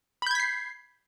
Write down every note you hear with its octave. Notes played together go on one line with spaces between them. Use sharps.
B5 G6 G#6 B6 C7